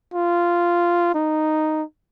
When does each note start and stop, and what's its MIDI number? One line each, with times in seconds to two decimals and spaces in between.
0.14 1.13 65
1.14 1.83 63